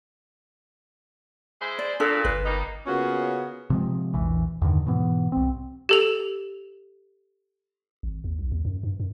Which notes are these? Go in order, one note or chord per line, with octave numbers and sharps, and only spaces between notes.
G#3 E4 C5
D5
A#2 D4 A4
G1 B4
G3 A#3 D#4
C#3 A#3 B3 C#4 F4 F#4
C3 F3 G#3
A#1 E2 E3
E2 G2 D3 D#3
G#2 B2 E3 B3
C2 C4
G4 A4 F7
G#1
D#2
B1
D#2
F#2
G2
F#2